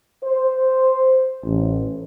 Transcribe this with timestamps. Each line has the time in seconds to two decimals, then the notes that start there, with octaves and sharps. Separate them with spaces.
0.23 C5
1.45 A1